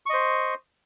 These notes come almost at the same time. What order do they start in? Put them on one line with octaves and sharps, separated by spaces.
C#6 D#5 C5